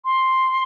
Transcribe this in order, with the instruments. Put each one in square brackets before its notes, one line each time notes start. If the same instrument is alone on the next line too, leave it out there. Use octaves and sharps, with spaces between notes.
[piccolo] C6